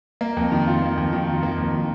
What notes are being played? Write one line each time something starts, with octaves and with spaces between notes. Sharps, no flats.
A#3
F2
D#3
F4
A#3
F2
D#3
F4
A#3
F2
D#3